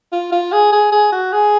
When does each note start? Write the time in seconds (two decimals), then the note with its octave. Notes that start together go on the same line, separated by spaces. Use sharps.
0.12 F4
0.32 F4
0.53 G#4
0.72 G#4
0.92 G#4
1.12 F#4
1.33 G#4